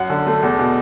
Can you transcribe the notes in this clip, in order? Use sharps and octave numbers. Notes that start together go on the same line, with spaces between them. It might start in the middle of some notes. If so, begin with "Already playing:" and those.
Already playing: F#2 F#5
D3
A3
E2
B2